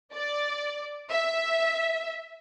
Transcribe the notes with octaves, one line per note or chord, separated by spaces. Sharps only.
D5
E5